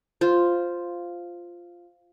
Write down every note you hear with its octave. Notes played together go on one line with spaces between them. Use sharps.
F4 C5